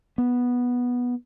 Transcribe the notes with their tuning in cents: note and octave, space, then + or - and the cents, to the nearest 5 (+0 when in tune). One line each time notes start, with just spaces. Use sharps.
B3 -10